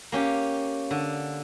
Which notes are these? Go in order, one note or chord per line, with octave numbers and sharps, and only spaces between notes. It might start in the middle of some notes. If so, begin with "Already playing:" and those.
A#3 C#4 G4
D3